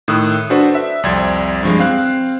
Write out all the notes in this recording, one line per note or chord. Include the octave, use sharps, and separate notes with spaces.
A2 D#3 D#6 E6 F#6
D4 F#4 A4 B4 C5
E5
C2 F2 D5 C6 G#6
G2 F3 G#3
C4 F5 F#6